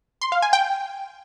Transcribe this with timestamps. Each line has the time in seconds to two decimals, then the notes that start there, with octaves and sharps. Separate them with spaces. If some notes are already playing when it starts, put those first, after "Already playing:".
0.21 C6
0.32 F5
0.42 G#5
0.53 G5